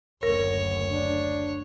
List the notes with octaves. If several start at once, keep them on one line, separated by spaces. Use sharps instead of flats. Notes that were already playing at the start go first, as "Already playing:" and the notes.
F#1 D2 A#4 C#5
D4